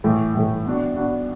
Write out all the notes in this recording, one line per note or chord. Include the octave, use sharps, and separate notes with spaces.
A2 E3 A3
A2 E3 A3
B3 D4 F#4
B3 D4 F#4